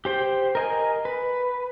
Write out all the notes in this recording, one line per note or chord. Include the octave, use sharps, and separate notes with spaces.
G4 C5 G5
A#4 D#5 G#5
B4